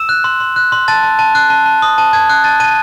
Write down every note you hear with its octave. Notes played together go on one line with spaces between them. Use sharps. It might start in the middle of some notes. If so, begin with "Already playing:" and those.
Already playing: E6 E7
F#6
C6
C6
F#6
C6
A5 A6
A5
A5
F#6
A5
A5
D#6
A5
A5 G#6
F#6
A5 A6
A5 D#7